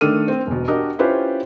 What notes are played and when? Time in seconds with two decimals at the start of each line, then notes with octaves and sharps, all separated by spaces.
0.01 D#3 A3 D4 A4 F6 D#7
0.28 C4
0.47 E1 B2
0.68 D4 F#4 G4 A#4 D#5
0.99 C#4 E4 F4 G4 B4 C5